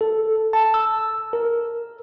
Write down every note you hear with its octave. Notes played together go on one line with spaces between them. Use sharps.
A4
A5
E6
A#4